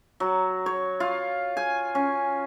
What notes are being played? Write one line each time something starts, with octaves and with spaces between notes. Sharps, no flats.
F#3
C#5
F4
G#5
C#4